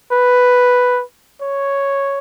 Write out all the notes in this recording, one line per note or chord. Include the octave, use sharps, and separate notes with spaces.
B4
C#5